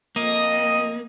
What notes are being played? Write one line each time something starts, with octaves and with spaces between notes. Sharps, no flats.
F2 A#3 D#5 D#6